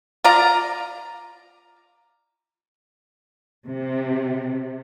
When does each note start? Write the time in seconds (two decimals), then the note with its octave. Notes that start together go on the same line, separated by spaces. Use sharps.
0.24 F4 D5 A#5
3.68 C3